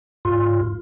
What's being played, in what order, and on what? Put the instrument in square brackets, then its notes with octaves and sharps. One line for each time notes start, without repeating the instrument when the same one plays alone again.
[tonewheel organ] G#2 F4